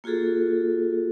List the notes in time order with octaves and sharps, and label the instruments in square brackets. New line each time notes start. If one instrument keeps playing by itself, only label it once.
[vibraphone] A#3 F4 F#4 G#4 A4